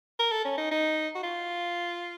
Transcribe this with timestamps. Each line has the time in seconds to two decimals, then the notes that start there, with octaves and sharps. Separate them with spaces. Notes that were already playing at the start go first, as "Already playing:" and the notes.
0.19 A#4
0.32 A4
0.45 C#4
0.58 D#4
0.71 D#4
1.15 F#4
1.23 F4